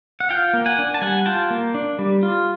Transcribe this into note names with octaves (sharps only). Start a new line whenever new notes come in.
F#5
F4 F5 G5
A#3
F#5 G#5
D4
A5
G3 F#5 G#5
F4 G5 A5
A#3
D4
G3
F4